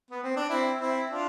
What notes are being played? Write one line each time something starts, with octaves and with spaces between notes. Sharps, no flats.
B3
C4
D4
C4 E4
C4 E4
D4 F4